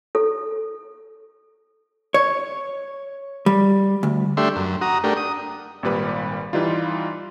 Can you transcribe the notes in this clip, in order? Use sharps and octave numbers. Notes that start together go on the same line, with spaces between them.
A4
C#5
G3
D2
A3 D4 G4 E5 C6
F#2
F#4 A#5 D#6
A3 D4 G4 A#4
D#6
G#1 A#2 G3 B4 B5
E3 G3 D#4 F4